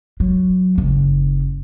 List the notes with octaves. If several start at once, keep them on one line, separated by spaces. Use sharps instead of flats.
F#3
F#1